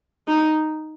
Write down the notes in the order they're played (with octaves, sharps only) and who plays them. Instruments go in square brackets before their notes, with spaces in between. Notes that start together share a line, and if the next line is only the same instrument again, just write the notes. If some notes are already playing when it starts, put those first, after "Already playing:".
[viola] D#4